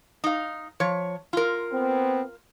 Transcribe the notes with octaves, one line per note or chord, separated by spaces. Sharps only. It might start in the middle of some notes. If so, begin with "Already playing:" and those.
D#4 F5
F3 C#5
F4 A#4
B3 C4